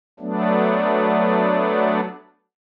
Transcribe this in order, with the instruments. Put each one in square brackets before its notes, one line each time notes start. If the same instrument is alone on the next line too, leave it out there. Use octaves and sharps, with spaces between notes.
[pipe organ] F#3 A3 B3 D4